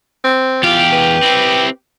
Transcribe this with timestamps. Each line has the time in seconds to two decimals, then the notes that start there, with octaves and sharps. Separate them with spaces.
0.24 C4
0.63 E2 F4 G4 F5
0.93 B4
1.22 C4 E4